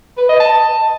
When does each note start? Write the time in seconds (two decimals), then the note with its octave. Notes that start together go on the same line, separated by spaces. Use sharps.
0.18 B4
0.29 D#5
0.40 A5